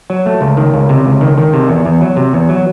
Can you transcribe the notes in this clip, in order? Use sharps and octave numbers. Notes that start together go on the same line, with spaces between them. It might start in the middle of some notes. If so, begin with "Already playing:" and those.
F#3
A3
C#2
D#3
C#2
C3
C#2
D#3
D#3
C3
E2
E2
F#3
C3
E2
F#3